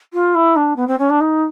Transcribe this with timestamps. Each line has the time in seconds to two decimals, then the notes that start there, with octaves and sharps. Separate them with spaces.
0.13 F4
0.35 E4
0.56 D4
0.76 B3
0.87 C4
0.98 C#4
1.10 D4
1.20 D#4